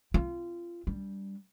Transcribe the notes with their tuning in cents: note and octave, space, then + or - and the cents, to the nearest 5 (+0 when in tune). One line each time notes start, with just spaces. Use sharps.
C4 +0 F4 -25
G3 +0 D4 -35